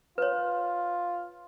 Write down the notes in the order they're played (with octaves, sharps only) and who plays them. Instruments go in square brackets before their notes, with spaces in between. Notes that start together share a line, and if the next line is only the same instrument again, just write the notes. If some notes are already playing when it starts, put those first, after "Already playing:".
[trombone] F4 [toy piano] B4 C#5